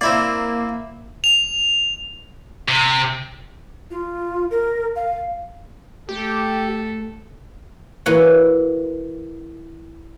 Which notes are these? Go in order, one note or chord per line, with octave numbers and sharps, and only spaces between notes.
A#3 C4 E4 D5
F7
C3
F4
A#4
F5
A3 G4 A4
E3 A#3 F#4 B4 C#5